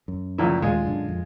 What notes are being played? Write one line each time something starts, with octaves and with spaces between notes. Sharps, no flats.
F#2
C#2 A#2 F3 E4
D#2 A#2 G#3 F4
F#2 D3 D4
F2